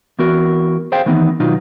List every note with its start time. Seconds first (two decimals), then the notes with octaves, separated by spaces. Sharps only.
0.19 E3 B3 F#4 A#4
0.92 G#4 C5 F5 G5
1.06 D#3 E3 B3 D#4
1.40 B2 D#3 F#3 D#4 F4